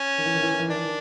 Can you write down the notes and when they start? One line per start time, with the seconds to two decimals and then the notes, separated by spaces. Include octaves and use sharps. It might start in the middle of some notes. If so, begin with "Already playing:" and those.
Already playing: C#4
0.18 D#3
0.26 E3
0.34 D#3
0.42 E3
0.51 D#3
0.59 E3
0.68 D#3 D4
0.76 E3
0.85 D#3